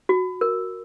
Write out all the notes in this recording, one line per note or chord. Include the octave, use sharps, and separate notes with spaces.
F#4
A#4